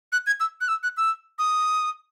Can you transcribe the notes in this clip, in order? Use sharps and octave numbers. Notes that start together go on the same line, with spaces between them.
F#6
G#6
E6
F#6
E6
F#6
E6
D#6